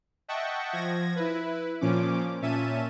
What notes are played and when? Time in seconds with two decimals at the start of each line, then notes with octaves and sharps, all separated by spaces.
0.28 D#5 E5 F#5 G5 A5 C#6
0.73 F3 G#6 A#6
1.16 E4 B4
1.81 A#2 F3 C#4 D6
2.42 A#2 C#4 E5 A5 D#7